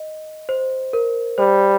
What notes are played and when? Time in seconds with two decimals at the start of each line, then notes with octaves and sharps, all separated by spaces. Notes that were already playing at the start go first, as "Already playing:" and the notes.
Already playing: D#5
0.49 C5
0.93 A#4
1.38 G3 C5